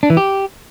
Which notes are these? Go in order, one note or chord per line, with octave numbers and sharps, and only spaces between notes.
D4
E3
G4